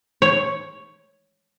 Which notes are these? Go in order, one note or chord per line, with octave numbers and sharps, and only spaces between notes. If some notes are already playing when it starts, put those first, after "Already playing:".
C#5